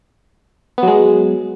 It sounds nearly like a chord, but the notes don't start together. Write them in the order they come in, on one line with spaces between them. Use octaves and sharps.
B3 F#3 G#3